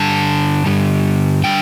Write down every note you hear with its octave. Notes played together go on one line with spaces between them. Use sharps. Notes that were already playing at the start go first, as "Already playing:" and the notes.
Already playing: G2 D3 G3 A5
G2 D3 G3
D3 G3 D4 G5